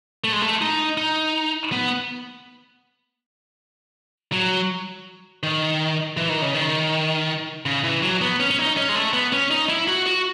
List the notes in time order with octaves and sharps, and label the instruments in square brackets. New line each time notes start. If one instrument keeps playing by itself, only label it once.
[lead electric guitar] A3
G#3
A3
D#4
D#4
B3
F#3
D#3
E3
D#3
C#3
D#3
C#3
E3
F#3
B3
C#4
C#4
D#4
C#4
G#3
A3
B3
C#4
D#4
E4
F#4
F#4